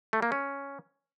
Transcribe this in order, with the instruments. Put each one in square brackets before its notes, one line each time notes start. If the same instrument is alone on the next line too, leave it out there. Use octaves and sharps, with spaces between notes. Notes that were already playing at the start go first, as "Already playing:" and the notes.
[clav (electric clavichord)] A3
A#3
C#4